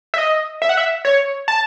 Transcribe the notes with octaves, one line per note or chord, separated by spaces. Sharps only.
E5
D#5
E5
F#5
E5
C#5
A5